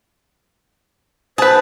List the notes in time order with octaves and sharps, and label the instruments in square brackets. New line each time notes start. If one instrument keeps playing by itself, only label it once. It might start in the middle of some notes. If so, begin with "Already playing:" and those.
[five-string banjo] G#4 B4 [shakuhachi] C5 [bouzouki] A5